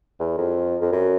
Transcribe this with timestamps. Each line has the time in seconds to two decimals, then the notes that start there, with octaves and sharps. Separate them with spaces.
0.19 E2
0.37 F2
0.81 F2
0.92 F#2